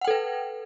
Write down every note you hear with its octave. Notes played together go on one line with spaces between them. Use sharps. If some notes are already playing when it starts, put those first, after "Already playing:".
A4 B4 F#5 G5